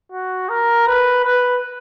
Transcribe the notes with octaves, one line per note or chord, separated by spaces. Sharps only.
F#4
A#4
B4
B4